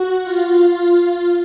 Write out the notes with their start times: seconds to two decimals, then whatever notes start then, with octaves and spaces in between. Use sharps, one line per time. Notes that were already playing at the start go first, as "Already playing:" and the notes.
Already playing: F#4
0.23 F4